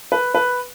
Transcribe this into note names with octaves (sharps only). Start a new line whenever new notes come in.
B4
B4